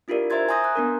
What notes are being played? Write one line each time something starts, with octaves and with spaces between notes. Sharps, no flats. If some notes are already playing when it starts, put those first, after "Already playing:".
D4 E4 F4 G4 A#4 D5
C5 E5 A#5 C6 G#6 A6
G#5 A#5 C6 D#6 G6 A#6
A#5 F#6
B3 D4 A#4